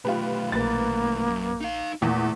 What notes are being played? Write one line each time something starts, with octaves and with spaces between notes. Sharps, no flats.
B1 A3 F4 G4 B4
A#1 A#3 B4 A6
F#2
D#4 F5
E2 A#2 A3